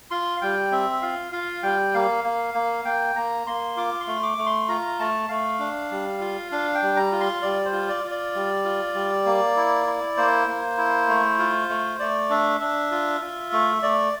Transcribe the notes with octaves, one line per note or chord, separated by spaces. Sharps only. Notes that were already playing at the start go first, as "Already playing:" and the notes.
F4 C6
F5
G3 G5
C4 E5
F4 F5
F4 F5
G3 G5
A#3 F5
A#3
A#3
A#3 G5
A#3 A#5
A#3 C6
F4 D6
C6
A3
D6
A3
C6
F4 A#5
A3 A5
A3 F5
D4
G3
F4
D4 F5
G5
G3
A#5
F4
C6
G3 D5
C5
F4
D5
F4
D5
G3
F4
G3
A#3
E4
E4
A#3 C5
A#3
E4
A3
F4
A3
A3 D5
D4 E5
D4 E5
F4
F4
A3
A3 D5